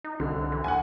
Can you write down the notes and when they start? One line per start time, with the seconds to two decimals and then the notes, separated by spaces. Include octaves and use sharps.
0.04 D#4
0.20 C2 D3
0.52 E3
0.64 D#2 F#5 G#5